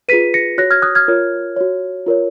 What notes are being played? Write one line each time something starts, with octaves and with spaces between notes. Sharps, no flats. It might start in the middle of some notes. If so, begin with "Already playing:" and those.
F4 G#4 B4 B6 D#7
A#6 C#7
F#4 C#5 F#6 A#6
F6 G#6
D#6 F#6
F6 G#6
F4 A#4 C#5
F#4 C#5
F4 A#4 C#5